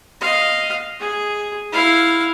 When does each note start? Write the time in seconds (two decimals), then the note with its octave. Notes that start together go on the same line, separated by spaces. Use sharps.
0.20 D#5 F5
1.00 G#4
1.73 E4 F5